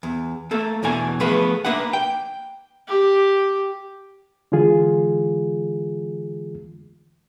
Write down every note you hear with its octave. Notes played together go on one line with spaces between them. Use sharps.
E2
A3 A#3 A4
E2 B2 E3 D4 G#5
F3 A3 B3 G#4 B4
A#3 D4 B4 E5 F#5
G5
G4
D3 E3 G#3 F4 G#4